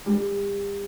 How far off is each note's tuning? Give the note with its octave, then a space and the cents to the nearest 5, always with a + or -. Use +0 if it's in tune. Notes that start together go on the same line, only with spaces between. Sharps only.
G3 +35